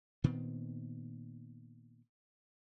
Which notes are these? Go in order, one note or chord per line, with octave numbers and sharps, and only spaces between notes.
A#2 D#3 B3 C4